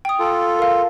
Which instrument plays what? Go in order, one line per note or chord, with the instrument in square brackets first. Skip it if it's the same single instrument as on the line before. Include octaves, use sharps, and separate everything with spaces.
[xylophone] G5 D#6
[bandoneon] F4 A4
[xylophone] A#4 F5